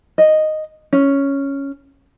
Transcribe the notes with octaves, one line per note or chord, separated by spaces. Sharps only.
D#5
C#4